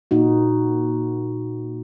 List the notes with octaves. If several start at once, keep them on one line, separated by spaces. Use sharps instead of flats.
A#2 D#4 F#4